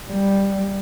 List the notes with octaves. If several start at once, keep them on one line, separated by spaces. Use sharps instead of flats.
G3